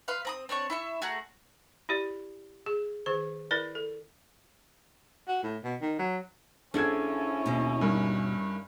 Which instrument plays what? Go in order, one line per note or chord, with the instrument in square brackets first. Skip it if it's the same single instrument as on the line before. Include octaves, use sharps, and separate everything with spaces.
[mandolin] B4 F5 C6
C4 A#5 D#6
C4 D4 C#5 C#6
E4 E5 C#6
A3 F#4 G#4 A#5
[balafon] E4 G4 D5
G#4
D#3 G#4 C5
E4 A#4 B4 D5
A4
[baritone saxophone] F#4
A2
B2
D#3
F#3
[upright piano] A#1 G#6 [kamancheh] C#4 E4 [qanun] D4 G#4 A4
[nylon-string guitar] D#2 B2
[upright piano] G2 D#3